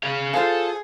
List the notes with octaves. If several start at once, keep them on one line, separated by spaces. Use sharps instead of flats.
G#4 F5
F4 G#4 A4 C5 F5